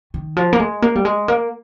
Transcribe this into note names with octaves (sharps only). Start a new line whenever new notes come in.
D#3
F3
A#3
G#3
A#3
G3
G#3
A#3